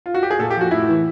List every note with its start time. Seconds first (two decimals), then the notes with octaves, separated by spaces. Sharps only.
0.06 F4
0.14 F#4
0.23 G4
0.30 G#4
0.39 A#2 A4
0.50 G4
0.55 F3
0.61 F#4
0.71 A2 E4
0.88 E3